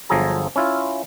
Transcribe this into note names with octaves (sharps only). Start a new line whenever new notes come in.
G1 F3 F#3 G#4 A4 A#5
C#4 E4 F4